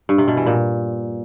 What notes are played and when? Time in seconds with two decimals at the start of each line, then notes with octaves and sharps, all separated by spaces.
0.09 G2
0.18 C3
0.28 B2
0.37 E3
0.46 A#2